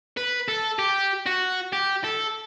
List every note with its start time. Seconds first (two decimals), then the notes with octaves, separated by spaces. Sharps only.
0.17 B4
0.48 A4
0.79 G4
1.26 F#4
1.73 G4
2.04 A4